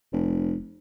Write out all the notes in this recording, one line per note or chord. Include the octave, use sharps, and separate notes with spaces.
F1